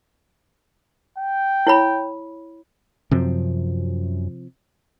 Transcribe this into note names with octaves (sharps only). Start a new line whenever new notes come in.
G5
E4 C#5 B5
F#2 C3 F3 C4